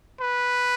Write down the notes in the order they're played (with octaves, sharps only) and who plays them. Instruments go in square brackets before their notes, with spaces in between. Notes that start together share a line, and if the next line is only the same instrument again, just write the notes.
[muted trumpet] B4